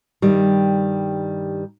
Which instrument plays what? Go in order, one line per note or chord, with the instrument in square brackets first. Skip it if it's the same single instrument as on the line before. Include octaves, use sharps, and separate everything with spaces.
[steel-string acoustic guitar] G2 D#3 G3